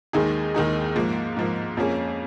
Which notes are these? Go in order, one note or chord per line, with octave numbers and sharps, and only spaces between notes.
D#2 D#3 G#3 D#4 G#4
D#2 D#3 G#3 D#4 G#4
G#2 F3 A#3
G#2 F3 A#3
F2 F3 A#3 C#4 G#4